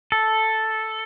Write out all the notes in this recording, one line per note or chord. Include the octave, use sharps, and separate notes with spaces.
A4